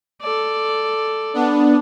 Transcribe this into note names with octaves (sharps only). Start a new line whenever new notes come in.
A4 D5
B3 D4